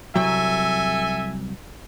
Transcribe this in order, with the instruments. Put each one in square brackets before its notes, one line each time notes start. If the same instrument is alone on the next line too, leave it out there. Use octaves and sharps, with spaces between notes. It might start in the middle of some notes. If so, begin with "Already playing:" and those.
[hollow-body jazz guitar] C2 F#3 [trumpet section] A4 E5 G#5